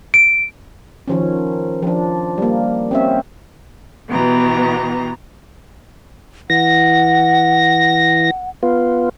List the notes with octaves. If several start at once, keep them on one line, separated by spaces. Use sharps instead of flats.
D7
D#3 F3 C#4
F3 D4
G3 A#3
C4 C#4 E5
B2 E3 B3 G4 A#5
E3 F#5 A#6
B3 F4